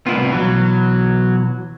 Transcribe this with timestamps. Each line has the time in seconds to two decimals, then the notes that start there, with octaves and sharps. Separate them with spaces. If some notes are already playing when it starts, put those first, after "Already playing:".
0.07 C2 A2 B3 E4 F4
0.32 B2 E3 F#3